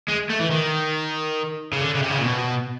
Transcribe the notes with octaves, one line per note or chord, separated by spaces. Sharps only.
G#3
A3
E3
D#3
C#3
D3
C#3
C3
C#3
A#2
B2